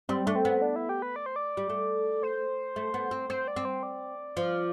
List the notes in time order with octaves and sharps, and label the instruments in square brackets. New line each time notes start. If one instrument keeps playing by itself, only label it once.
[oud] G3 [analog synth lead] C4
[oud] A3 [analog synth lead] D4
[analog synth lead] C4
[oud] B3
[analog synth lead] D4
E4
G4
B4
D5
C5
D5
[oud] G3
A3
[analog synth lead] C5
[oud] A3
B3
C4
[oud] C4 [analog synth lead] C5
[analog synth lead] D5
[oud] C4
[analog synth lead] C5
D5
[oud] F3